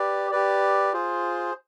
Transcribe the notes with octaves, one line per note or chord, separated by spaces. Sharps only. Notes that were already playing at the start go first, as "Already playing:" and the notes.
Already playing: G4 B4 D5
G4 B4 D5
F4 G#4 C5